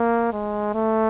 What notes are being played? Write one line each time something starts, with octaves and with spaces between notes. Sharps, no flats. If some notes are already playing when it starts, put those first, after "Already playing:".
Already playing: A#3
G#3
A3